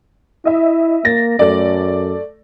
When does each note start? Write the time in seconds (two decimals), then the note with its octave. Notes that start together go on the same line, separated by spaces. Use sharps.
0.45 E4 D#5 E5
1.05 A#3 A6 A#6
1.39 F#2 A3 D5